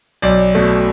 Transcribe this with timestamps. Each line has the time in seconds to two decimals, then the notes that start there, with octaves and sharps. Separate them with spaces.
0.22 B1 D5
0.55 B2 A3